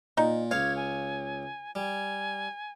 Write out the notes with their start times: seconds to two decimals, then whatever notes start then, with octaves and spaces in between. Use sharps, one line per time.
0.17 A#2 D#4
0.51 C#2 C#5 F5 G#6
0.76 G#5
1.75 G3 G#5